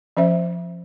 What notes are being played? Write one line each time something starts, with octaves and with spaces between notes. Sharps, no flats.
F3 C#4 C5 E5